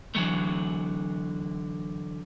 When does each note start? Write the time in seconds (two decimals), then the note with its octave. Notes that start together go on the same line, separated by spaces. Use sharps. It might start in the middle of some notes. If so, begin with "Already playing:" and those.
0.15 D3 E3 F#3 A3